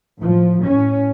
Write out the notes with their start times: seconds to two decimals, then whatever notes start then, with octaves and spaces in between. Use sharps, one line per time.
0.19 A2 F3
0.65 A2 C#4